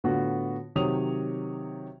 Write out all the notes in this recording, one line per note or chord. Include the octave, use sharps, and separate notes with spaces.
A2 D3 B3 F4 F#4
C3 D#3 F#3 C#5 D#6 F7